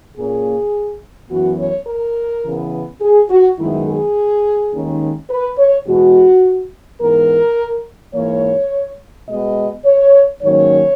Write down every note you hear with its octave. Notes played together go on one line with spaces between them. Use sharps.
A#2 A#3 C#4 G#4
F#2 E3 B3 F#4
C#5
A#4
C#3 E3 B3
G#4
F#4
F#2 D#3 G#3 B3 E4
G#4
D#2 D#3 G#3 C#4
B4
C#5
E2 B2 G#3 B3 F#4
G#2 E3 B3 A#4
G#2 E3 A#3 C#5
B2 G#3 B3 D#5
C#5
G#2 D#3 F#3 A#3 C#4 C#5